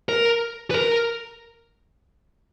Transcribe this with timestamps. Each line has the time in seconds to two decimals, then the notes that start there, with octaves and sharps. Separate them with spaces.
0.09 A#4
0.71 B4
0.75 A#4